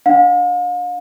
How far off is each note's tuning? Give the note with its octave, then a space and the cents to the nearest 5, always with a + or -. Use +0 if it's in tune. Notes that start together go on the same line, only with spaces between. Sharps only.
D4 +0 F5 +40